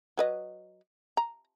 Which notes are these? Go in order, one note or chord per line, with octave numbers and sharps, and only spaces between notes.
F#3 B4 D#5
A#5